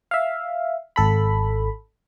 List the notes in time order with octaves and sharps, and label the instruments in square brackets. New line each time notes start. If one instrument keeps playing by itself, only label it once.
[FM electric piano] E5 F5
G#1 A4 B5